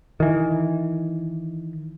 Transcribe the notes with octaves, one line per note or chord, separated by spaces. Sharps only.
D#3 E3